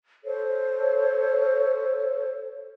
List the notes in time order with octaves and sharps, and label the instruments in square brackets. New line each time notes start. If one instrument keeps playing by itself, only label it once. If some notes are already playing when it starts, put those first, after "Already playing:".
[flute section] A4 C5 C#5